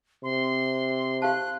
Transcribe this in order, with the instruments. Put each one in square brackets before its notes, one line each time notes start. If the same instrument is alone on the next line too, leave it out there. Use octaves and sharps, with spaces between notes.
[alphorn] C3 [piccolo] C6
[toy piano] G4 F5 A5 [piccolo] F#6